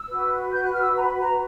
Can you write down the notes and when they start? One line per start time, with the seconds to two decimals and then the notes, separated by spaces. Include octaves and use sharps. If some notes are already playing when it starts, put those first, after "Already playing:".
Already playing: E6
0.09 F#4 B4
0.53 G6
0.63 F#6
0.74 F6
0.83 E6
0.97 A#5
1.02 B5
1.20 A#5